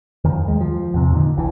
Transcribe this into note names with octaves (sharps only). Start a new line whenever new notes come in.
F2 D#3
D#2 G#3
F3
E2 C3
A#2 D3 D#3
F1 C#2 E3